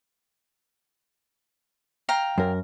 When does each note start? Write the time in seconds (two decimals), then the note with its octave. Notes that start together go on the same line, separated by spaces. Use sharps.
2.09 F5 G5 A#5
2.38 F#2 A#4